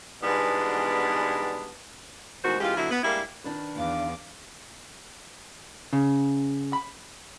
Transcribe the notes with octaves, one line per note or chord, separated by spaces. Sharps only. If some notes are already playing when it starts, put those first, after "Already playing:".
G#2 B2 E3 G3 B3 D4
E2 A2 D#3 G#3 F#4 C5
F#2 E3 G#3 F4 G4 F5
B2 D3 F#3 E4
B3
G3 G#3 A#3 D4 E4
D#3 D4 B4
E2 F5 D6
C#3
B5